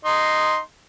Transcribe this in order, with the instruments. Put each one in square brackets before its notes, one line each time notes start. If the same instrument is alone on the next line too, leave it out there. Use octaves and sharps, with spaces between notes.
[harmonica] D#4 C6